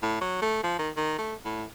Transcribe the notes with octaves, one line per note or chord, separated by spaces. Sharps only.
A2
F#3
A3
F3
D#3
D#3
A3
A2